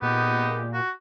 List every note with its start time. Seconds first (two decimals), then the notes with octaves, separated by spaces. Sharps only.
0.02 A#2 G#3 B3 D#4 G4
0.73 F#4